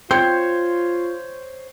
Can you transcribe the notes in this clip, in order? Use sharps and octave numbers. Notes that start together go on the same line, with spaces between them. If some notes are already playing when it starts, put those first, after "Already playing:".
C4 F4 C5 C#5 G6